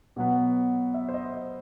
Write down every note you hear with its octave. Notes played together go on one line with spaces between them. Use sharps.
B2 F#3 B3
E5
C5
D#5
C5